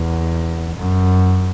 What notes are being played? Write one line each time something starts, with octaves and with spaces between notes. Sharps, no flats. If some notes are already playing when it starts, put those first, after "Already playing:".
Already playing: E2
F#2